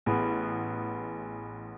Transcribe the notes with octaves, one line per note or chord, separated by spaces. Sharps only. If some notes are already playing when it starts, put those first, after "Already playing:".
A1 B3 G#4